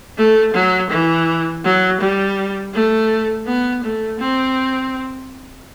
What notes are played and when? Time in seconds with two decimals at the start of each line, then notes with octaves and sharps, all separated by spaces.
0.18 A3
0.54 F#3
0.90 E3
1.65 F#3
2.00 G3
2.73 A3
3.47 B3
3.84 A3
4.20 C4